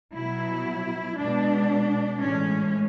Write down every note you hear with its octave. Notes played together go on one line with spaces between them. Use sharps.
B2 F#3 E4
B2 G#3 D4
A2 E3 G#3 C#4